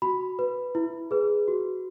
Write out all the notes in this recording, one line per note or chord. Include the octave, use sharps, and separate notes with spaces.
F#4 B5
B4
E4
G#4 B4
F#4